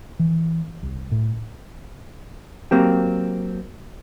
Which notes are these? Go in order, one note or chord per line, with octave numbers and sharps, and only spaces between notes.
E3
C2
A2
F#3 A#3 C4 G4